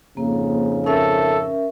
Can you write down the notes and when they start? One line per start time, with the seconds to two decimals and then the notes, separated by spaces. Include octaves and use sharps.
0.17 F2 G#2 C#3 A#3
0.86 C#4 A4 A#4 E5